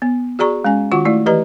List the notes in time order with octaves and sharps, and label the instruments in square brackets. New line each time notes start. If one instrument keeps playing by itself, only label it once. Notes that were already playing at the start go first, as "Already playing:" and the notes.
[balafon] B3
F#4 G#4 D5 A#5 C#6
G#3 C#4 G#5
D#3 F4 F#4 F#5 C#6
A3 E4 D5
E3 G4 B4 D#5 A#5